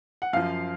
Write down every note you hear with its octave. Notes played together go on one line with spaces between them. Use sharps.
F#5
F#2 F3 F5